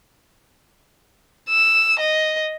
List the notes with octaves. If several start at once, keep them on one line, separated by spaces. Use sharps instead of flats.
E6
D#5